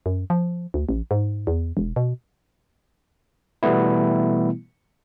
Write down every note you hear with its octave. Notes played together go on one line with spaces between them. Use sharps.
F#2
F3
D2
A1
G#2
E2
E1
B2
B2 E3 G3 A3 B3 E4